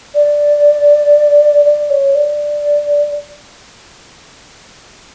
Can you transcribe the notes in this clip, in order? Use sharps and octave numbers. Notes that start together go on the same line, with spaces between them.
D5
D5
C#5
D5